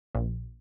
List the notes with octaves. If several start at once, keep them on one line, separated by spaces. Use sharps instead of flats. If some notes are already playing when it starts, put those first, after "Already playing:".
A#1